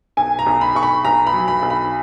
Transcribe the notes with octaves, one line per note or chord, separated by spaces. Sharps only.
B1 G#5
A#5
B1
B5
B1 C#6
B5
B1 A#5
B5
F#3
B5
B1
B5